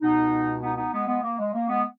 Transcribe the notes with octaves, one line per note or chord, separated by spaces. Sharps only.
C#2 B2 B3 D#4
B3 D#4
B3 D#4
G#3 B3
G#3 B3
A#3
G#3
A#3
G#3 B3